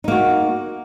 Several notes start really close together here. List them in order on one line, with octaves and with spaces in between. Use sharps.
D#4 A#3 F#4